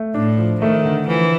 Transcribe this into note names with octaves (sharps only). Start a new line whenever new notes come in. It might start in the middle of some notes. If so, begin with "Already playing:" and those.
Already playing: A3
A2 D4
F3
D#3 A3
D3
E3 F3